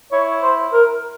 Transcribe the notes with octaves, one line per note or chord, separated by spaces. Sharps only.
E4 C#5
C5
A#4